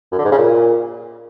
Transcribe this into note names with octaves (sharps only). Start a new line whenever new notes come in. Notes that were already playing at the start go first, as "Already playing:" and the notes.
F#2
D3
G#2
C#3
A#2